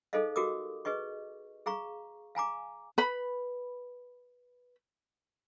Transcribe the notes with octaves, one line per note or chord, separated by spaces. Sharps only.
D#4 G#4 A4 C5 D#5 F5
F#4 G4 A#4 D6 D#6
G#4 B4 D#5 C#6
G#4 F5 A#5 C#6
F5 G#5 A#5 D6
B4 B5